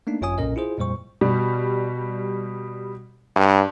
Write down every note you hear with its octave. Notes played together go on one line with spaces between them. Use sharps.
A3 A#3 D4 D#4
G#1 F#2 F4 C#5 G#5 D#6
B1 A#2 C#4 A#4 D#5
E4 F4 G#4 C5
F2 A#2 G3 C5 C#6
B2 G3
G2